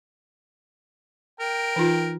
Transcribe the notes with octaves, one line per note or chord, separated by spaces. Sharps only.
A#4 G5
E3 D#4 F4